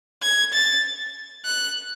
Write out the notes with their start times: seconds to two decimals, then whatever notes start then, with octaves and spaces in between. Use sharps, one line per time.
0.23 G#6
0.53 A6
1.45 F#6